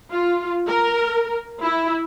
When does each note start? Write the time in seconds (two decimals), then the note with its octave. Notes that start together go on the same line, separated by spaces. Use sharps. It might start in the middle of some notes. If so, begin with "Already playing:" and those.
0.12 F4
0.67 A#4
1.63 E4